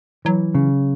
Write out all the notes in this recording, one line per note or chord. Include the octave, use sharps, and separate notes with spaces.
E3 F#3
C#3